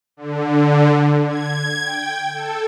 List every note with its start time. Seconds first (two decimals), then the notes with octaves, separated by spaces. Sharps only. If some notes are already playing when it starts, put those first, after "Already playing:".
0.17 D3
1.28 G#6
1.82 G5
2.34 A4